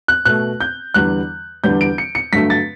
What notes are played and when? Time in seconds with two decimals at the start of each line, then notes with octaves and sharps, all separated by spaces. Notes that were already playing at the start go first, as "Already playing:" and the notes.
0.08 F#6
0.25 B2 A3 F#6
0.60 G6
0.94 E2 D3 G3 B3 F#6
1.64 E2 D3 G3 B3 G6
1.81 D7
1.98 C#7
2.15 C#7
2.33 G2 D3 F#3 A3 B6
2.50 A6